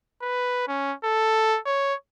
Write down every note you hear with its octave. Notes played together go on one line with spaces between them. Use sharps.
B4
C#4
A4
C#5